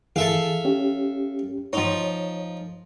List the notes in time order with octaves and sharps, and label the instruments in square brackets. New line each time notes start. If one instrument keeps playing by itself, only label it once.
[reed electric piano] E3 G#4 [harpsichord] A4 E5 F5
[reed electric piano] C#4 G4
[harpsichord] F3 D#4 [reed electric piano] C#5